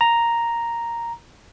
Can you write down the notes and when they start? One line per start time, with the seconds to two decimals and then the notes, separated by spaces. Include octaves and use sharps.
0.01 A#5